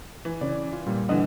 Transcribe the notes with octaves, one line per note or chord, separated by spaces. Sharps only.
E3
C#3 C#4 D5
F4
A#2 G3
D3 E3 D#5 F#5